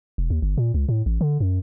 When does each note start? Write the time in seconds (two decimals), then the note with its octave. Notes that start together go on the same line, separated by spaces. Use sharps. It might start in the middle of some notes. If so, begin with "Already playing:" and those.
0.18 E1
0.30 D#2
0.42 G1
0.58 A#2
0.74 C#2
0.89 A2
1.06 A1
1.21 D3
1.40 F#2